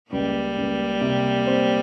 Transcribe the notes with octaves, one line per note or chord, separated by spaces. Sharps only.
C#2 G3 A#3
C#2
C3
C4